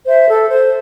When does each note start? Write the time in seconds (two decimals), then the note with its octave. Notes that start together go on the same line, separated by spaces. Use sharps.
0.06 C5 E5
0.28 A4
0.49 C5